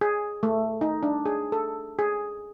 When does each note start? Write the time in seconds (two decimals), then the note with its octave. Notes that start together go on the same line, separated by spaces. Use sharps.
0.01 G#4
0.43 A3
0.81 D#4
1.03 D4
1.26 G#4
1.52 A4
1.99 G#4